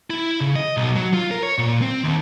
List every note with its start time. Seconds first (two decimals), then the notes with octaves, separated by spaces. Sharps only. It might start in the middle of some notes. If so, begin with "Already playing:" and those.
0.10 E4
0.41 C#3
0.56 D#5
0.77 B1
0.96 F#3
1.14 F4
1.31 A#4
1.43 C#5
1.58 A#2
1.82 C4
2.04 D#2